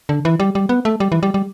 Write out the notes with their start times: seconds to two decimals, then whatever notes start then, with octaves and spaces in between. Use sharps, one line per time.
0.09 D3
0.25 E3
0.40 G3
0.55 G3
0.69 B3
0.85 A3
1.00 G3
1.12 E3
1.23 G3
1.34 G3